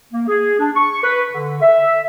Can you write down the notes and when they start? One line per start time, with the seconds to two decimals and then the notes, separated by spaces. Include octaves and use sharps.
0.12 A#3
0.28 G#4
0.59 D4
0.76 C#6
1.03 B4
1.32 D3
1.61 E5